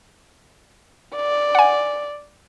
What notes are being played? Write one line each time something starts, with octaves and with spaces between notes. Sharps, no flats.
D5
F#5 G#5